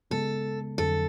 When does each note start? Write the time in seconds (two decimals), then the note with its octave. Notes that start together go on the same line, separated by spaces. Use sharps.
0.11 C#3 G#3 B3 A4
0.78 F2 D3 F#3 A4